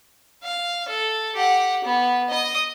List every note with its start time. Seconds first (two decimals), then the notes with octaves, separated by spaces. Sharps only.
0.43 F5
0.89 A4
1.35 G4 F#5
1.84 B3
2.29 D#5 D#6